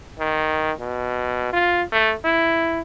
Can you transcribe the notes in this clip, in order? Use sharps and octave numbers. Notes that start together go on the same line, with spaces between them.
D#3
B2
F4
A3
E4